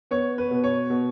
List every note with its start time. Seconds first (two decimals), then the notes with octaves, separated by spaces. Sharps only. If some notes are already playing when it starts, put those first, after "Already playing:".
0.11 B3 C#5
0.38 B4
0.51 B2
0.64 C#5
0.90 B2